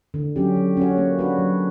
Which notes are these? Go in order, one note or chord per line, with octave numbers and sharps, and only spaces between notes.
D3
F#3 C#4 G4
F#3
C#4 F#4 C#5
A#3
D4 F#4 B4
F#3